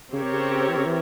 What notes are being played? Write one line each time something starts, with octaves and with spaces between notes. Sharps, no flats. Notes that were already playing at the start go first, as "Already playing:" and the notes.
C#3 C4 G4 A#4 C#5
C3
C#3
E3
C#3
E3